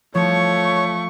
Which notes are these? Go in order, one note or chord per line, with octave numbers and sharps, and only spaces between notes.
F3 A3 C#5 C#6